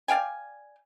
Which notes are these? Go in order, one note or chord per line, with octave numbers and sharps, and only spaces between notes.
D5 F5 G5 G#5